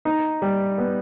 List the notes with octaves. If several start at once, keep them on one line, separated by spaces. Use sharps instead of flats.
D#4
G3
B3